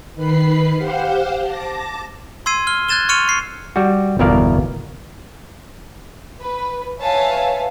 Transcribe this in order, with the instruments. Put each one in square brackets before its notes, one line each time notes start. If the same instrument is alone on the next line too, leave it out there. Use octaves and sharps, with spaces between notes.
[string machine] D#3 B4 B5 C7
G4 C5 F5 F#5
A5 D6 A#6
[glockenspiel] C6 E6 G#6 C7 D#7
F6 G7
F#6 G#6 A6 E7 G7
C6 C#6 F6 C#7 D#7 F7
C#6 C7
[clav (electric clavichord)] G3 F#4
G1 E2 B2 A#4 D5 F5
[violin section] B4
B4 C#5 E5 F5 G#5 A5